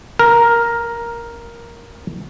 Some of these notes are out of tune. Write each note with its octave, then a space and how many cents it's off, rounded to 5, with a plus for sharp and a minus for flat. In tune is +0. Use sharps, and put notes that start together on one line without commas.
A#4 +5